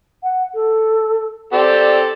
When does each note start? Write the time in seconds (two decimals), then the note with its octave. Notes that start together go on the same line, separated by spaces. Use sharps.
0.23 F#5
0.54 A4
1.53 C4 G4 A4 D5